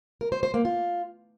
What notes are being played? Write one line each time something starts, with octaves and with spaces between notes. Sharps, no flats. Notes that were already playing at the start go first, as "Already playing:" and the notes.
A#4
C5
C5
A#3
F4